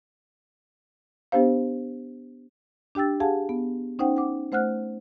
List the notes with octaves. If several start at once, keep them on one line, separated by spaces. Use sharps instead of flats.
B3 D4 G4 C5 F5
D4 G4 G5 E6 A6
G4 G#4 F5 F#5 G#5 A5
B3
C#4 D#4 C5 F#5 G5
F#5 D6
A3 C5 F#5 F6 F#6